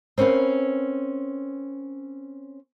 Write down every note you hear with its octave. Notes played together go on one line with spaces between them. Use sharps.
C4 C#4 A#4 B4 F5